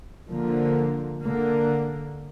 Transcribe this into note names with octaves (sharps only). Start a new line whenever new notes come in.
D3 F3 A#3
D3 A#3